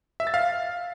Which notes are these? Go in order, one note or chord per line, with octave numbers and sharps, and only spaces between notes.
E5
A6
F5